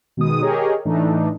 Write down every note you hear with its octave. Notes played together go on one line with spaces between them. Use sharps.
B2 D#3 G#3 D#6
G4 G#4 A#4 C#5 D#5
A2 E3 A3 D4 D#4